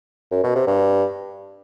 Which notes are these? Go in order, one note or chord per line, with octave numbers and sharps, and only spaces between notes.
F#2
B2
C3
G2